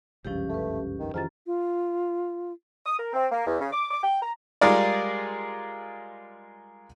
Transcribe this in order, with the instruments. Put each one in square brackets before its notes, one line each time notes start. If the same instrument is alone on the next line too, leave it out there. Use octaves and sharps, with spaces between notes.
[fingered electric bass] F#1 C#2 G2 [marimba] C3 F3 [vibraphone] C#4 G4
[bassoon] A3 [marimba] A4 B4
[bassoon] D#3
[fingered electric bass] F2 D#3 E3 [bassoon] G#2 [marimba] F4 A#5 A6
[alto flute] F4
[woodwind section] D#6
A#4
C4
A#3
E2
C#3
D6
D6
G5
A#5
[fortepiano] G3 G#3 F4 G#4 A#4 D5